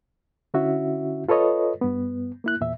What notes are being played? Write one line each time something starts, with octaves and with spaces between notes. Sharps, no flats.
D3 C#4 E4 F#4 E5
F4 A4 B4 C#5 D#5
G2 B3
A#3 E4 F#6
E2 A#2 E5